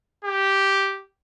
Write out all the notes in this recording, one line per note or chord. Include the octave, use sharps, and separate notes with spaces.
G4